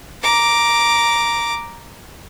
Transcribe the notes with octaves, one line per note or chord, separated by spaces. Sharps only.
A#5 D6